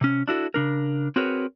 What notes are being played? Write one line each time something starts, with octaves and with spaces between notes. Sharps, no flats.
C3 C#4
D4 E4 F#4 A4
C#3 D4 A#4
C4 F#4 G#4 A#4 B4 C#5